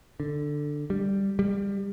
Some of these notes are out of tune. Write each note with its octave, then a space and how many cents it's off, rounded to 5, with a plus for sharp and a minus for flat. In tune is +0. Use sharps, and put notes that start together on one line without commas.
D3 +5
G3 +5
G3 +25